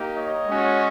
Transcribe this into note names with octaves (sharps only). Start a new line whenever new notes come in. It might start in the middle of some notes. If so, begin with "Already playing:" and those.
Already playing: A#3 D#4 G4
C#5 D#5
G#3 C#4 F#4